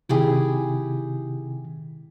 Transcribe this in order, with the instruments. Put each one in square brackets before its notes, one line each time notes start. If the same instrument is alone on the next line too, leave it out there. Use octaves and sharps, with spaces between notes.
[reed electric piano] C3 D#3 [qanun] E4 G4 G#4